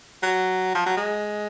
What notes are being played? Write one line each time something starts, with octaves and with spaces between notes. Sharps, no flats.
F#3
F3
F#3
G#3